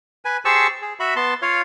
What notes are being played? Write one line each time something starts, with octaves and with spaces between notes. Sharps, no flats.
B4 G#5
G4 G#4 C5 A5 C#6 E6
G#4
F#4 E5 B5
B3 A5 C6
F4 C#5 F5